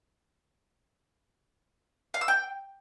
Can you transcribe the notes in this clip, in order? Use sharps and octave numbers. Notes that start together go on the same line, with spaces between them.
F5
E6
G5